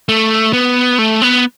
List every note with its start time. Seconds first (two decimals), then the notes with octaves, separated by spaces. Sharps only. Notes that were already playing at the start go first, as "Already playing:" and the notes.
0.09 A3
0.53 B3
0.99 A3
1.22 B3